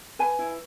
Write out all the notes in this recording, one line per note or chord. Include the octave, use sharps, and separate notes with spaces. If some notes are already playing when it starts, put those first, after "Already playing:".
B4 G#5
E4